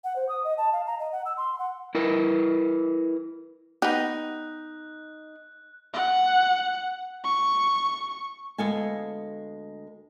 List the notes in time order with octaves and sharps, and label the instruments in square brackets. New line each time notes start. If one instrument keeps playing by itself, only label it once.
[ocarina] F#5
C5
D#6
D#5
A5
F5
A#5
D#5
F#5
E6
C6
F#5
[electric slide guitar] E4 A#4 B4
[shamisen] B3 G4 [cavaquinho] D#4 [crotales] F#6
[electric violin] F#5
C#6
[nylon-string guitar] D2 G#3 B3 A4 F5 G#5